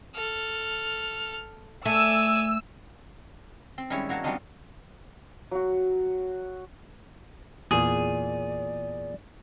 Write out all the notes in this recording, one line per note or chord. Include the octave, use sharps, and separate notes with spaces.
A4 F6
A3 D5 G#5 E6
C4
D#3 G3 G#3 C#4 E4 C#5
F#3 A#3 F#4 C#5 A5
G3 B3 C4 D4 D#4 F4
F#3 F#4
E2 A#2 G#4 D5